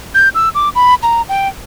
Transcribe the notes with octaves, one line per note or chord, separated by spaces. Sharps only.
G6
E6
D6
B5
A#5
G5